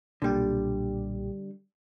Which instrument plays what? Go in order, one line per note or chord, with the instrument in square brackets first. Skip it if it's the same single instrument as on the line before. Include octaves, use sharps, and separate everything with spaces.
[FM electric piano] B1 A#2 G4 [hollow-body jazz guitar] D3 G3